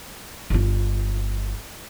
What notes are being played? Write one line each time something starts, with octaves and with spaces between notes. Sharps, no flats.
G1 F4